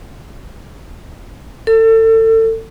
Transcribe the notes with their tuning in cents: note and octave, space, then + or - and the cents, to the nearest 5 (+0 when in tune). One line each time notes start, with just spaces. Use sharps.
A4 +30